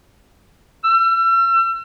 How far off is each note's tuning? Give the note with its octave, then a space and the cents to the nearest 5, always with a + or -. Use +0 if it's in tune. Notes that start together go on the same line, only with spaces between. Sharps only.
E6 +40